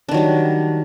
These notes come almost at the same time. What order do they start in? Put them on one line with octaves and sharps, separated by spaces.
D4 D#3 F#3 G3